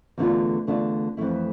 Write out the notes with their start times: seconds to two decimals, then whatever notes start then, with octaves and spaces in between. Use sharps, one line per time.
0.18 E2 D3 A3 D4 F4
0.67 E2 D3 A3 D4 F4
1.17 F2 E3 A3 E4